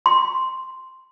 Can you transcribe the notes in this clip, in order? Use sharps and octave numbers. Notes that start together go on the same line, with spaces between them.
C6